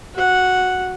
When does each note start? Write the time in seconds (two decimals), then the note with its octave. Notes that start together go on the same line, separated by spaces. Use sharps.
0.14 F#4 F#5